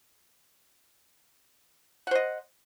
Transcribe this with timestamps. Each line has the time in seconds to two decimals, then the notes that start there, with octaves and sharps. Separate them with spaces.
2.07 F#5
2.11 C5
2.15 D#5